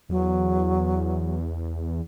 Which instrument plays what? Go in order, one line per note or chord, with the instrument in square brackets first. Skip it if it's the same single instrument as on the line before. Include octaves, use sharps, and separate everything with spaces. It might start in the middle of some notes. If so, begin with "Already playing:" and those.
[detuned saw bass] E2 [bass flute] F#3